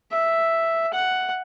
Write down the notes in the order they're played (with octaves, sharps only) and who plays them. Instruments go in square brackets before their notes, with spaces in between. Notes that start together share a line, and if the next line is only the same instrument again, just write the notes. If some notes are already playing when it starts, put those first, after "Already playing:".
[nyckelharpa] E5
F#5